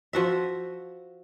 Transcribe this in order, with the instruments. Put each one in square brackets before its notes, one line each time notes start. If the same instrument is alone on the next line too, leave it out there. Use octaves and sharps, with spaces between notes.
[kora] F3 F#4 E5